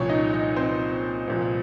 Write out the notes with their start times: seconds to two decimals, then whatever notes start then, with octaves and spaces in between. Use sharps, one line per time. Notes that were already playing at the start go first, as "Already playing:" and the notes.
Already playing: C2 A#2 F3 C#4 C#5
0.09 D#4 D#5
0.33 D#4 D#5
0.56 C4 C5
1.28 C2 A#2 F3